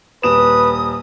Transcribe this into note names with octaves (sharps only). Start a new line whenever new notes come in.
D#1 B4 D#6 E7